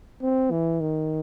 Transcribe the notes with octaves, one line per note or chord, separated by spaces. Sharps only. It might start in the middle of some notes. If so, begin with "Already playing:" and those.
C4
E3
D#3